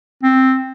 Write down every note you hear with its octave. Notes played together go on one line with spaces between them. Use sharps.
C4